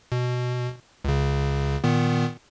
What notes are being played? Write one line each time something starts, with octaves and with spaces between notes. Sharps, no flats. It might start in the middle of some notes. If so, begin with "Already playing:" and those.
B2
C#2 C#3
A#2 D#3 B3